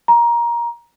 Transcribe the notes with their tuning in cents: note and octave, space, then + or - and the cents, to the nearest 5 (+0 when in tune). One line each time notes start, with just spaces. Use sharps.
A#5 +20